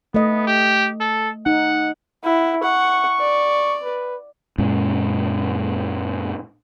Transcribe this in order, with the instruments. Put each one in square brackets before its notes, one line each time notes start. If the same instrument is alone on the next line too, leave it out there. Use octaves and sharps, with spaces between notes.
[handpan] A3 D#5 [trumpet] B3
[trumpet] G4
A4
[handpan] D#4 [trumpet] F#5
[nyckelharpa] E4 [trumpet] F#5
[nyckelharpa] F#5 [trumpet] C#6
[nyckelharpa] D5
[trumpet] B4
[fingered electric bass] F#2 A#2 G#3 C#4